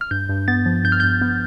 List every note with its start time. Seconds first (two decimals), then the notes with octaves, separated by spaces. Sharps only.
0.01 F6
0.11 G2 G6
0.29 G2
0.48 B3 A6
0.66 F3
0.84 G2 G6
0.92 F6
1.00 G2 G6
1.21 B3